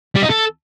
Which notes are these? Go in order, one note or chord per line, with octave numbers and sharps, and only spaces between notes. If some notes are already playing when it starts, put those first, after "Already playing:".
G3
D#4
A4